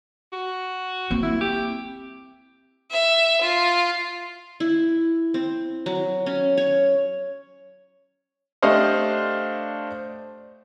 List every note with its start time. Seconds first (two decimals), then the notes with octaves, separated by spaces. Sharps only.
0.33 F#4
1.10 A#3 C4
1.23 E4
1.41 G4
2.91 E5
3.42 F4
4.60 E4
5.34 C4
5.86 F#3
6.26 C#4
6.58 C#5
8.62 A3 D4 G4 C5 D#5 F5